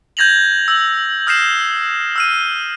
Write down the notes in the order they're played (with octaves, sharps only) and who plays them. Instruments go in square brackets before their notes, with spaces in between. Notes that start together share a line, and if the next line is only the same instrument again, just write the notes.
[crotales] G6 G#6 A#6 F7 F#7
E6
D#6 F6 G6 A#6 C7 E7
E6 F6 D#7